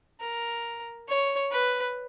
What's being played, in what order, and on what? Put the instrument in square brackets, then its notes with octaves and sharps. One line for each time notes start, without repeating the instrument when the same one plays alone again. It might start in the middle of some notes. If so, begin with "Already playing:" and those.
[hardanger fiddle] A#4
C#5
B4